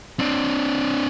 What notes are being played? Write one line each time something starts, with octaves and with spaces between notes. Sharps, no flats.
C4 D4